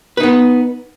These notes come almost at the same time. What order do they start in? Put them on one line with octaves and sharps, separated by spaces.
B4 D#4 B3